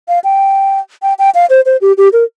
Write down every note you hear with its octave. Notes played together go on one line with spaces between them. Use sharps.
F5
G5
G5
G5
F5
C5
C5
G4
G4
A#4